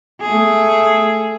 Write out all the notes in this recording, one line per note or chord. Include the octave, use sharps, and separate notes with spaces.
A3 G#4